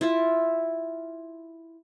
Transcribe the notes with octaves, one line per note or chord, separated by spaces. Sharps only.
E4 F4 E5